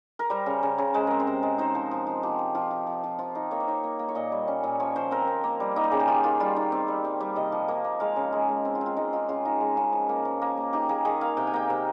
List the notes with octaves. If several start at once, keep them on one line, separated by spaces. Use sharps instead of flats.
A#4
G3 C5
C#3
C#3
C#3
G#3 C5
C4 A#4
C5
C3
G#3
D#4 C5
F3
F3
F3
F3 G4
F3
F3 F4
F3
F3
F3
F3 F4
D#4 G4
A#3 C#5
C5
D#4 C#5
A#3
A#3
C#5
A#2 D#5
G3
C#4
A#2
F3 C#5
F3 C5
C4 A#4
C4
A#3
G3
A#3 D#4
G4
C#3 G#4
G4
D#3 F4
D#3 F4
G3 F4
D#3
C4
G3
C4
G3
C3 D#5
F3
A#3
A#3
G#3 F5
C#3
G#3
G#3
C4
F4
C4
F4
G#3 D#4
D#4 F4
C#3 F4
D#4
G#3
C#3
F3
A#3
F3
A#3
A#3
D#4 G4
A#3 G#4
D#3 G#4
A#3 F5
C3 G5
G#5
A#3 G5
C3